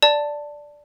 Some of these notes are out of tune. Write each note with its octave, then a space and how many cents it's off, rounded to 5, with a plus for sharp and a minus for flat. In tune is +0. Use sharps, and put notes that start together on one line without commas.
D5 +0 A5 +10